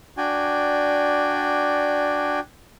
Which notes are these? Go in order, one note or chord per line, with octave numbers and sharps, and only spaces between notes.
D4 F#4 D5 G5 G#5